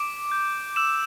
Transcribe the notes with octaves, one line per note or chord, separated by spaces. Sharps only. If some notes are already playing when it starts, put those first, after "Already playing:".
Already playing: D6 D7
G6
D6 E6 E7